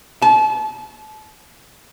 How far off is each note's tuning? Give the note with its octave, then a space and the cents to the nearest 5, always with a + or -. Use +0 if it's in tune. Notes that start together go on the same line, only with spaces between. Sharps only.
A5 -35